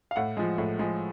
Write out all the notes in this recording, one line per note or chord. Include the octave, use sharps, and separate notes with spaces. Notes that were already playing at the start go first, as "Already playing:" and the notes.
F5
A2 F#5
F3 G#3
A2
F3 G#3